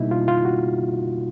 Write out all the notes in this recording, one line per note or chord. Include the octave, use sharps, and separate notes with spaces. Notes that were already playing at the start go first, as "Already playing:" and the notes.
Already playing: B2 G3 A#3 D#4 E4
F4
F4
F#4